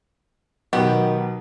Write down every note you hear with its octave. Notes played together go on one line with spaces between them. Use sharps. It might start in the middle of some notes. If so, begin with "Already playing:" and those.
B2 D#3 F#3 B3 G4